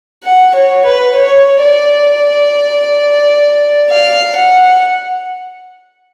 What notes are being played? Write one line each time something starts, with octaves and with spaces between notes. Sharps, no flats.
F#5
C#5
B4
C#5
D5
F5
F#5